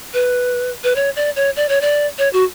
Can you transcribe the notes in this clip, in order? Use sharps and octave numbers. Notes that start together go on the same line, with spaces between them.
B4
B4
C#5
D5
C#5
D5
C#5
D5
C#5
F#4